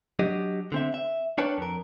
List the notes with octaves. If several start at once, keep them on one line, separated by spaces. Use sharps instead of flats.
F#3 D4 G4 D#5
D3 C4 E5
E5
D4 A#4 B4 C#5 G5 A5
F2 A#4